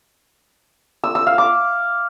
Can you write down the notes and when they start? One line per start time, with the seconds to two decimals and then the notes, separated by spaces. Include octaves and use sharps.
1.04 E6
1.15 E6
1.27 F5
1.38 D6